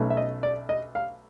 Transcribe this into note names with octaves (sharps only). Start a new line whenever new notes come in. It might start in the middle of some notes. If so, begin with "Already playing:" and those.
Already playing: B1 B2 F#3 A3 C#4
E5
D#5
D5
D#5
F5